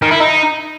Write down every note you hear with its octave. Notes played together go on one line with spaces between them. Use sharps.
D#3
E4
D#4